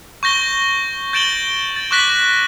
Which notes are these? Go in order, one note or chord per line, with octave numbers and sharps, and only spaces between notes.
C#6 G6 A#6 G7
G6 A6 D7 E7 F#7 G7
A6
C#6 D6 F#6 A#6 B6 F#7